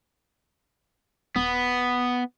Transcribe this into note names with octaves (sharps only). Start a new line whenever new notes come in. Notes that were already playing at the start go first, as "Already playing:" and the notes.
D#1 B3